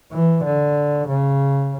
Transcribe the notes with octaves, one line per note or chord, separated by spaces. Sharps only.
E3
D3
C#3